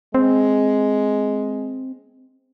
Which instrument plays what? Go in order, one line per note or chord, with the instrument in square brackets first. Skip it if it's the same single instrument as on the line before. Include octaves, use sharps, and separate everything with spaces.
[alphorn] G#3 [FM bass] C4